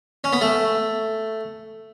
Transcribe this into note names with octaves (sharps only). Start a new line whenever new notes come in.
C#4
B3
A3